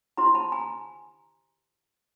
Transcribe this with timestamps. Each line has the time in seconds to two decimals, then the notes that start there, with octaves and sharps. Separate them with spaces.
0.17 E4 G4 C5 A#5 C6
0.34 A5 B5
0.52 G#5 A#5